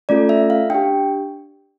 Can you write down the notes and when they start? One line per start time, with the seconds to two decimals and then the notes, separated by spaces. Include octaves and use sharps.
0.09 A3 C#4 F4 A4 D5
0.29 E5
0.50 F5
0.70 D4 G5
0.75 G4